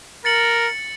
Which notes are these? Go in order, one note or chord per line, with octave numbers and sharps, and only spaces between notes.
A#4 A6 C#7 F#7